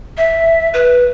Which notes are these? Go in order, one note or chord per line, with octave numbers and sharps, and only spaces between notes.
E5
B4